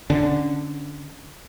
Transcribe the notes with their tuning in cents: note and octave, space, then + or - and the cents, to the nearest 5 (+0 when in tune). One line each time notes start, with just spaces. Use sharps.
D3 +0 C#4 +0